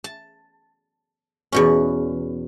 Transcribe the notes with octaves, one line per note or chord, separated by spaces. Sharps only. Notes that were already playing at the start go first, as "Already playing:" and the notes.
A5
E2 B2 C#4